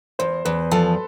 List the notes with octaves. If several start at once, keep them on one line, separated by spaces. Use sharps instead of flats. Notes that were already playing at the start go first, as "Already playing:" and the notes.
E2 C5
E2 B4
F3 A4